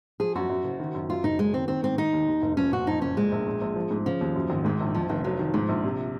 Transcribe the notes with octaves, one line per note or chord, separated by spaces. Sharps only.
F3 G#4
F#2 F#4
F#2
F#1
D#3
F#2
F#2 F4
F#1 D#4
F#3 G#3
D#3 C4
D#3 C4
G#2 C4
D#3 D#4
D#2
D#2
F1
F3 C#4
A#2 F#4
F2 D#4
F#1 C#4
A#2 G#3
A#1
A#2
A#1
F3
G#2
C#3 F3
D#2
F#2
G#1
G#2 D#3
A#1
F2 F3
F1 D#3
F3 F#3
D#3
G#2 F3
A#1
C3